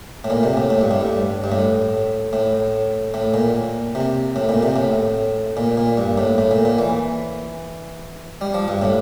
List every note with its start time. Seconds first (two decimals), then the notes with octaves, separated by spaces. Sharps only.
0.24 A2
0.30 A#2
0.43 C3
0.57 A2
0.70 A2
0.81 G2
0.91 A2
1.01 G2
1.44 G2
1.52 A2
2.33 A2
3.14 A2
3.34 A#2
3.95 C3
4.36 A2
4.49 A#2
4.63 C3
4.76 A2
5.57 A#2
5.77 A#2
5.97 G2
6.18 A2
6.38 A2
6.51 A#2
6.65 A#2
6.78 E3
8.41 G3
8.54 F3
8.68 G2
8.82 A2